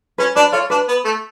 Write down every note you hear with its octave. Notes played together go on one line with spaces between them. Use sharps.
C#4 B4
D4 B4 D5
F4 A4 C#5
D4 B4
B3
A3